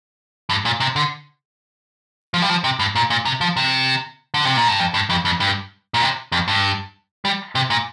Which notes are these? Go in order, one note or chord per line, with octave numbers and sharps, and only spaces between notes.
G2
A#2
C3
D3
F3
G3
F3
C3
G2
A#2
A#2
C3
F3
C3
D3
C3
A#2
G2
F2
G2
F2
F2
G2
A#2
C3
F2
G2
G3
C3
A#2